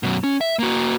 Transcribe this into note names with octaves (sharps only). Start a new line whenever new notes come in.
F#2 B2
C#4
E5
A#3 F#4